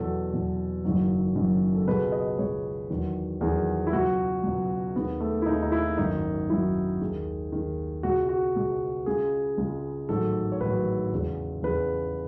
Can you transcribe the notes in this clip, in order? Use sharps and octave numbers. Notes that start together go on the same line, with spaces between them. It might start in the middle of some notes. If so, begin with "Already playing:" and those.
Already playing: E2 B2 F#3 A4
E2 B2 F#3
F#1 F#2 D#3 F#3
F#1 F#2 D#3 F#3
A4
C#2 B2 G#3 B4
D#5
C#2 B2 G#3 C#5
E2 D#3 F#3
E2 D#3 F#3 G#4
E4
C#2 B2 F#3 F#4
C#2 B2 F#3
D#2 D#3 G#3 B3
A3
E4
D#2 D#3 G#3 D#4
D#4
E4
G#1 F#2 D#3 F#3 D#4
G#1 F#2 D#3 F#3 E4
D#2 D#3 G#3
D#2 D#3 G#3
C#2 B2 G#3 F#4
F#4
C#2 B2 G#3
C#2 C#3 G#3 G#4
C#2 C#3 G#3
A1 G#2 D#3 F#3 A4
C#5
A1 G#2 D#3 F#3 B4
E2 C#3 G#3
E2 C#3 G#3 B4